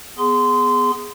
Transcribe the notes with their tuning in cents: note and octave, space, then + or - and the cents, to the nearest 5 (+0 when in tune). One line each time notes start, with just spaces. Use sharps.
B3 +10 G#4 +0 C6 -20